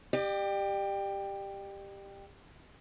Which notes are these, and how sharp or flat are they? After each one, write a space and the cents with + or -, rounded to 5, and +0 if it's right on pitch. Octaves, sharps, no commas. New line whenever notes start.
G4 +10 D5 +45